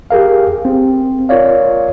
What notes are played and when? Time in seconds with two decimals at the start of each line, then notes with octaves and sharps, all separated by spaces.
0.11 G4 G#4 A#4 F5
0.65 C4
1.29 F4 A#4 C#5 D5 F5